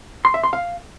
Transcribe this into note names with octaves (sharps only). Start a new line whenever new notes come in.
C6
E5
C6
F5